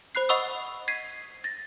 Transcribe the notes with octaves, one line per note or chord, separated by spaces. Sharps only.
C5 B5 F#6 C7
D#5 F#5 B5 C#6 D#6 E6
G#6 B6 C7 D#7
A6 A#6